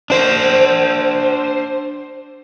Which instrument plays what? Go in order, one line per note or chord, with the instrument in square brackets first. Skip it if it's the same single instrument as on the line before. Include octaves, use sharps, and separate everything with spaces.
[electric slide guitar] D4 C5